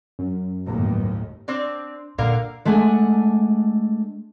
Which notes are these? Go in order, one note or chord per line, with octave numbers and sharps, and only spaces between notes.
F#2
G1 D#2 A2
C4 D4
A#2 D3 A#4 F5
G#3 A3 D4 F#5 G#5